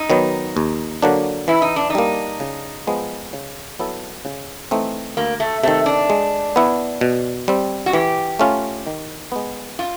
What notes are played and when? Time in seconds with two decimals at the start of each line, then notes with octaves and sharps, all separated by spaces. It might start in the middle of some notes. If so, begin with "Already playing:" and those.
Already playing: D#4
0.10 D#3 F#3 B3
0.57 D#2
1.02 D3 F#3 A#3 D4
1.48 E3 E4
1.62 D#4
1.76 D4
1.90 D#4
1.95 G3 A#3
2.40 C#3
2.87 F3 G#3 B3
3.33 C#3
3.79 F#3 B3 E4 A4
4.25 C#3
4.71 E3 A3 C4 D#4
5.17 D2 A#3
5.40 A3
5.63 C3 D#3 A3
5.86 D4
6.10 G#3
6.56 B3 E4
7.01 B2
7.48 G3 C4
7.86 F#4
7.93 E3 G4
8.39 A3 C#4 F4
8.87 D#3
9.32 G#3 B3
9.79 F4